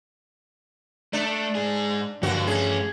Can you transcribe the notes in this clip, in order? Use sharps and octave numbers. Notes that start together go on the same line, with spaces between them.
A3 D4
G#2 G#4
G2 D3 F3 A#3 F#4
A3 C#4 G#4